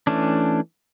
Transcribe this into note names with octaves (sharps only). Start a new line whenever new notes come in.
E3 A3 C#4 D4